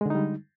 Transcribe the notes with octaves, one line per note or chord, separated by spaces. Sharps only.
D3 G3 G#3 D#4